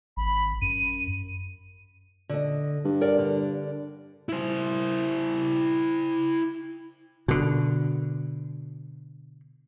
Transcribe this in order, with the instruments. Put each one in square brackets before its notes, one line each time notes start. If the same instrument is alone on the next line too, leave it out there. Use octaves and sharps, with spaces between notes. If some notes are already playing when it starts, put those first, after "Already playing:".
[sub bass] G#1 [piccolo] B5
[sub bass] F#2 [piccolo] D#7
[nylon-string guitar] D3 D#5
[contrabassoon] G2
[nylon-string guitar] A#4 D5 F#5
D3
[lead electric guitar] E4 C5
[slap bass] B2 D3